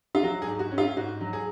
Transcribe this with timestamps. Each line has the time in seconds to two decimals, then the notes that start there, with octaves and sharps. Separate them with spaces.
0.15 F4
0.23 F#3 F#4
0.42 G#4
0.47 G#2
0.59 F#4
0.71 C#4
0.78 F4
0.97 G#2 F#4
1.21 F#3
1.33 G#4